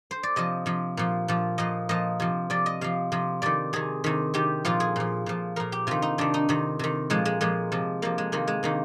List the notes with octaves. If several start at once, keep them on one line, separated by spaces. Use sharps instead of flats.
C5
D5
C3 F3 D#5
C3 F3
A#2 F3
A#2 F3
A#2 F3 D#5
A#2 F3 D#5
C3 F3
C3 F3 D5
D#5
C3 F3 F5
C3 F3
C3 D#3 D5
C3 D#3 G#4
C3 D#3
C3 D#3 G4
A#2 F3 F4
G#4
A#2 F3
A#2 F3
A#2 F3 A#4
G4
C3 D#3 F4
D#4
C3 D#3 D4
D#4
C3 D#3
C3 D#3
A#2 F3 G#3
G#3
A#2 F3 G#3
C3 F3
C3 F3 A#3
G#3
C3 D#3 A#3
G#3
C3 D#3 A#3